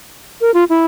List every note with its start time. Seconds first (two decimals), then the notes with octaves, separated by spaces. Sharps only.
0.41 A#4
0.54 F4
0.69 E4